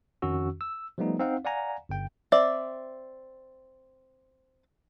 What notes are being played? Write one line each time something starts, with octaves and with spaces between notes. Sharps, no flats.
F2 D#3 C#4 F#4 E6
E6
F3 G3 A3 B3 D#4
C4 D#4 F5 F#5
D5 F5 F#5 G#5 A#5
G1 G5
C4 D5 E5